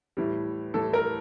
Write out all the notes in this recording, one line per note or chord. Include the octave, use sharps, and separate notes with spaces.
A2 E3 G3
A2 E3 G3 A4
A#4